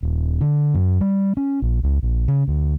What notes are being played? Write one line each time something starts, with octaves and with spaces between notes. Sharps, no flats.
D#1
D3
F#2
G3
C#4
A#1
C#2
A#1
C#3
D2